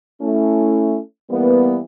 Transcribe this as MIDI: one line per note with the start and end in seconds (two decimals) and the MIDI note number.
0.21 0.98 57
0.21 0.98 61
0.21 0.98 64
1.30 1.79 52
1.30 1.79 55
1.30 1.79 58
1.30 1.79 59